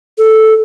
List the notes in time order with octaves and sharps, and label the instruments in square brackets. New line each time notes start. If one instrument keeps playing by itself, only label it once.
[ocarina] A4